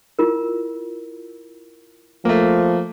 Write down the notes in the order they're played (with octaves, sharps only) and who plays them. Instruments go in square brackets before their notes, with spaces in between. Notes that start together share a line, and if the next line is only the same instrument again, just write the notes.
[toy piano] E4 F4 A#4
[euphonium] F3 [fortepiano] A3 A#3